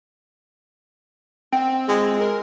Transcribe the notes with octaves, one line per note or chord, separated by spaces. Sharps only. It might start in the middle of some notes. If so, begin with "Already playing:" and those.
C4 D#5 F#5 G5
G#3 E4 F4 D#5
A#4